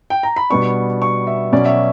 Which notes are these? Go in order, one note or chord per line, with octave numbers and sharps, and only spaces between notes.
G5
A#5
B5
B2 G3 B3 D4 C#6
C#6
E5
B2 F#3 C#4 D5
E5